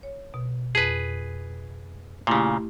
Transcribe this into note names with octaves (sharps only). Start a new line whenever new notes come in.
C#5
B2
F2 G#4 B4
A#2 C#3 A3 E4 G4